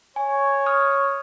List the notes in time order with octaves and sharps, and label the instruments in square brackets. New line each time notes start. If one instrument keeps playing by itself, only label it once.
[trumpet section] C#5 [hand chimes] G#5
[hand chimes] D#6 F6